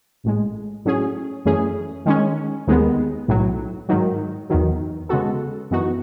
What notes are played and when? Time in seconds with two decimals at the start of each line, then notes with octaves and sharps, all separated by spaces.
0.24 A1 A2 G#3
0.85 A2 F#3 C#4 G#4
1.45 F#2 E3 A3 C#4 G#4
2.06 D#3 G#3 C#4
2.67 D#2 D#3 G#3 B3
3.28 B1 A2 F#3
3.89 G#2 D#3 F#3
4.50 E2 D#3 F#3
5.09 C#3 G#3 B3 F#4 A4
5.71 F#2 E3 B3 D#4 F#4